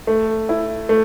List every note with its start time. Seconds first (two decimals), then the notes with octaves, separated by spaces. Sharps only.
0.07 A3
0.49 E4
0.89 A3